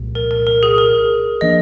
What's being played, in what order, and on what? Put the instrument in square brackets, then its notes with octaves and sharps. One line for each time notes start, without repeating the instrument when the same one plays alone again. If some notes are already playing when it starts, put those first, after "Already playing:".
Already playing: [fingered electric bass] C2 A#2 F3 G#3
[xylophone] A#4
A#4
A#4
G#4
A#4
[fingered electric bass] F3 A#3 D4 [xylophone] D#5